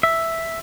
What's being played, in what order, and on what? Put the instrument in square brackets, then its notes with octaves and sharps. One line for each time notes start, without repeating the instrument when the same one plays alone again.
[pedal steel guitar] E5